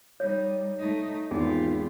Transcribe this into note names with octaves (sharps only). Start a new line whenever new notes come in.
G3 D#4 C#5
A3 D#4
G#1 E2 F4 G4 G#4